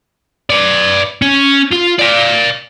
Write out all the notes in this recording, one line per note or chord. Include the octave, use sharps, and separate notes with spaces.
B4 D5
C#4
F4
D5 F5